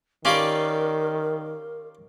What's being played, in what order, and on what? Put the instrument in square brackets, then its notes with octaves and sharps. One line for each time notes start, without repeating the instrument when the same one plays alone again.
[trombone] D#3 [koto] C#4 D5 F5 [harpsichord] F4 G4 B4 [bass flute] A#4